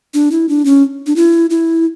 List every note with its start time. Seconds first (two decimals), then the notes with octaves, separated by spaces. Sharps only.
0.14 D4
0.32 E4
0.49 D4
0.65 C#4
1.07 D4
1.16 E4
1.50 E4